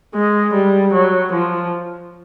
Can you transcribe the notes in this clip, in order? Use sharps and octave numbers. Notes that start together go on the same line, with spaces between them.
G#3
G3
F#3
F3